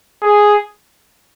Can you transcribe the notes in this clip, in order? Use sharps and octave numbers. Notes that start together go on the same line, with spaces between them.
G#4